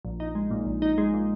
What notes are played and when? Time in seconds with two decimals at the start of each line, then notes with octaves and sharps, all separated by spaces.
0.05 A#1
0.20 D#4
0.35 G#3
0.51 A#2
0.66 A#1
0.82 D#4
0.98 G#3
1.14 A#2